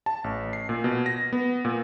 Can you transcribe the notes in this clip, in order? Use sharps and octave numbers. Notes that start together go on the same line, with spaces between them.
A5
A1
C7
A#2
B2
A#6
B3
A#2